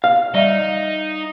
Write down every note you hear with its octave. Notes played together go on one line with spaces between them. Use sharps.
F5
G3 D#4 D5 E5